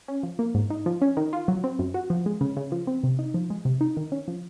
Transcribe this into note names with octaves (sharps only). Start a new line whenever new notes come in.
C#4
F3
A#3
G#2
D#4
F3
C#4
D#3
F4
F#3
C4
F#2
F#4
F3
G#3
C#3
C#3
F3
C4
C3
D#4
F3
G#3
C3
D#4
D#3
C#4
F3